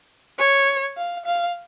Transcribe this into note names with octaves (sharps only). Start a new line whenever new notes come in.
C#5
F5
F5